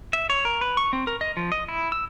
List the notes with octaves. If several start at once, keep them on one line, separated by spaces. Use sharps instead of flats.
E5
C#5
A#4
B4
C#6
C4
A#4
D#5
F3
D#5
E4
E6